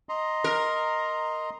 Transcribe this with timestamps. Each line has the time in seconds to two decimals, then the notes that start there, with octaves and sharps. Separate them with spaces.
0.09 D#5 A#5 C6
0.44 A#4